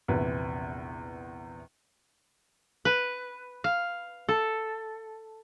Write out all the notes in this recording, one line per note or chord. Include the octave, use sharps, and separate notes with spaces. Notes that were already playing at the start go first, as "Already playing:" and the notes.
A#1 E2 C3 B3 B4
B4
F5
A4